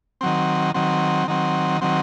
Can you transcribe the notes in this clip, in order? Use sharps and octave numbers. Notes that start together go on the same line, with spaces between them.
D#3 F#3 C4
D#3 F#3 C4
D#3 F#3 C4
D#3 F#3 C4